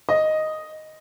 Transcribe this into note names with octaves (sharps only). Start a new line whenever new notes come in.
D#5